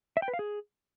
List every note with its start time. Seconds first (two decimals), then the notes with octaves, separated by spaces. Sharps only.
0.17 E5
0.22 G5
0.28 B4
0.34 F5
0.39 G#4